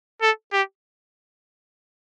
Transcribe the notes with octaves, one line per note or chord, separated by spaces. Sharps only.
A4
G4